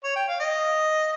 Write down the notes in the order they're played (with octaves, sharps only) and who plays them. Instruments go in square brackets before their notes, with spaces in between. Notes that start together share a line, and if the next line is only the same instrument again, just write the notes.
[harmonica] C#5
G5
F5
D#5